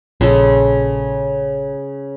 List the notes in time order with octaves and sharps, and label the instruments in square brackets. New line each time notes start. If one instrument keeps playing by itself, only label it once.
[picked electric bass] A#1 [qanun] C#3 G#3 A4